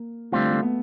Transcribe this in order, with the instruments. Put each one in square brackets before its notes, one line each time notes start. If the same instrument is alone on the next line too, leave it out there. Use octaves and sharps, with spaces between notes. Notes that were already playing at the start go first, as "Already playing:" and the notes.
Already playing: [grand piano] A#3
[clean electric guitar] D3 G3 C4 F4 [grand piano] A3
[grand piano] A3
B3